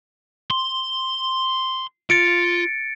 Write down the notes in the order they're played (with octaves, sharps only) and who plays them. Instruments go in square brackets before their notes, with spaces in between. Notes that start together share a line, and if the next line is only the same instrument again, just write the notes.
[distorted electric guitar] C6
[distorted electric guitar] F4 [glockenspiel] A6 C#7 D7